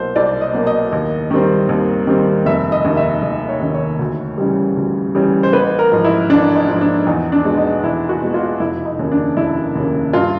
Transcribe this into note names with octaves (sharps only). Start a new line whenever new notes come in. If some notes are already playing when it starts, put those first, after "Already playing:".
Already playing: C2 B2 F#3 A#3 C5
C2 D5
D#5
B2 F#3 A#3
D#5
D#2
D#3 G3 C4
D#2
D#3 G3 C4
F1 E5
D#5
D#2 D#3
E5
F1 D#5
C#5
D#2 D#3
C#5
D2
C#3 E3 G3
D2
C#3 E3 G3
C5
A1 B4
A#4
G#2 F3
E4
A1 D4
D#4
G#2 F3
D4
E2 D#4
D4
B2 G#3
D#4
E2 E4
F#4
B2 G#3
F4
F1 E4
D#4
D#2 C#3
D4
F1 E4
D#2 C#3
G2 F4